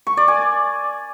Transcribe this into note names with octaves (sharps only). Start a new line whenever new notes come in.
C#6
D5
G#5